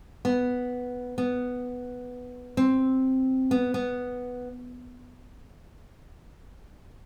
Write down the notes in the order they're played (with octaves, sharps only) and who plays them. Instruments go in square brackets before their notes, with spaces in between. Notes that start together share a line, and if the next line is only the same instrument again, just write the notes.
[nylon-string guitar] B3
B3
C4
B3
B3